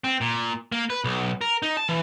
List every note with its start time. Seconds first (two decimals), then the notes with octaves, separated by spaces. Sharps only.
0.04 C4
0.21 A#2
0.72 A#3
0.90 B4
1.04 B1
1.41 A#4
1.62 D#4
1.77 A5
1.89 E3